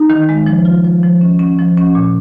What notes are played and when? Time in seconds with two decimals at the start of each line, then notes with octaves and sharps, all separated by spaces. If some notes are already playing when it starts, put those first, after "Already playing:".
Already playing: D#4
0.10 D#3
0.29 G#3
0.46 F3
0.65 F4
0.84 F3
1.03 F3
1.21 C#4
1.39 C#4
1.59 F3
1.78 C#4
1.95 A#2